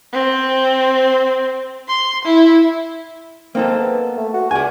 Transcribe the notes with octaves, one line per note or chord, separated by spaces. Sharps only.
C4
C6
E4
A#3 C4 D#4 A4
B3
A3
F#4
C#2 D5 G#5